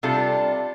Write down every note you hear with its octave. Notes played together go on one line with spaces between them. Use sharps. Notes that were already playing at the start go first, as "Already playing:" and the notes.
C3 G3 D4 F4 A4